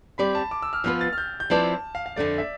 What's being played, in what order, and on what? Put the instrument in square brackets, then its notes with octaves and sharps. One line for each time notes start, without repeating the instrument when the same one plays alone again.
[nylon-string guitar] G3 C4 G4 D5 [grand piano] B5
[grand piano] A5
D6
E6
F6
[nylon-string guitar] F3 B3 F4 B4 [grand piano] F6
[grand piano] A6
F6
G6
G6
[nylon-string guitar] F3 C4 E4 B4 D5 [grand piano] A5
[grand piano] F5
F5
[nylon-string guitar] F2 D3 A3 [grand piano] D5
[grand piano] E5